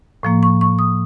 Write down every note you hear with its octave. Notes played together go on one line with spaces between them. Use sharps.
A2 F3 A#3
C#6
C#6
D#6